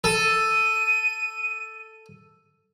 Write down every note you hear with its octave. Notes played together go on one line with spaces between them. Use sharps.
A4 D#7